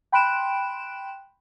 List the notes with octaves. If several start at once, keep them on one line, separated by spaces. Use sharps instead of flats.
G5 B5 C6 F#6 D7 E7